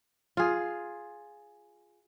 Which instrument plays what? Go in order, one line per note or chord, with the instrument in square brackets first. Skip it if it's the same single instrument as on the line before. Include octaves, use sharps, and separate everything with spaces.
[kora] F4 G#4